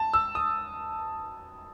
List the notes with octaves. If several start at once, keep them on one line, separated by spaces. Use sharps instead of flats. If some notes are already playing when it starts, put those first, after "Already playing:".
Already playing: A5
E6
D#6